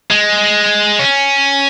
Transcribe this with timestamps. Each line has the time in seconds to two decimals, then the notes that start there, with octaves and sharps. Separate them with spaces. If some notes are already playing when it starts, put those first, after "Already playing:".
0.11 G#3
0.99 C#4